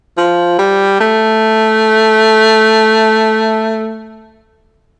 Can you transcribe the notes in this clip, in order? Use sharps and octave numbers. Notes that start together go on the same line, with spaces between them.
F3
G3
A3